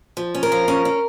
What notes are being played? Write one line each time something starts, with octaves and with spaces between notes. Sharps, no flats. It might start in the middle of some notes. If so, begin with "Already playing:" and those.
F3
C#4
A#4
F3
C#4
C#4